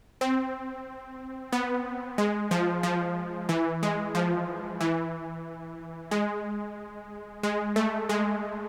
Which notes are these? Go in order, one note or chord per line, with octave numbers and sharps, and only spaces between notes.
C4
B3
G#3
F3
F3
E3
G#3
F3
E3
G#3
G#3
A3
G#3